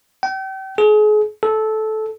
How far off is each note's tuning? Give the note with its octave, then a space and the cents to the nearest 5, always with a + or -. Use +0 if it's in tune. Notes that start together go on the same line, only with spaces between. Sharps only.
G5 -35
G#4 +35
A4 -15